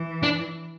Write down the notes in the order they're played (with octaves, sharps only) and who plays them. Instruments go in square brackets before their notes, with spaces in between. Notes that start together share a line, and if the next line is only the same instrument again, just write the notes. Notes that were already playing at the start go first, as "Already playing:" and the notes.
Already playing: [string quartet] E3
[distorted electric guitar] D4